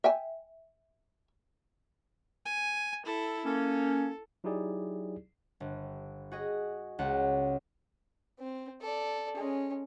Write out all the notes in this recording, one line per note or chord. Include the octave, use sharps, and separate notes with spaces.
E5 G5 G#5
G#5
E4 A4
A#3 C#4 A4
F#3 D#4 E4 G4 G#4 D5
G1
F#4 G#4 D#5
C#2 F#5
C4
A4 D5
G#3 C#4